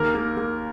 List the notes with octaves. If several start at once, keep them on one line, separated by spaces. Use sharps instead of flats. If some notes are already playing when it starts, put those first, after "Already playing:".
Already playing: D#2 A#3 A#4
A#3
A#3